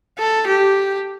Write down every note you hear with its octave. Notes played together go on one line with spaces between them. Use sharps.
A4
G4